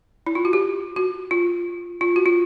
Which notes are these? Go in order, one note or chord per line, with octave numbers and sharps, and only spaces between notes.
E4
F4
F#4
G4
F#4
F4
F4
F#4
F4